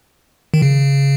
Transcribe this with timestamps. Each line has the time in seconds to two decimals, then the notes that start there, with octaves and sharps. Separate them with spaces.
0.54 D#3
0.62 C#3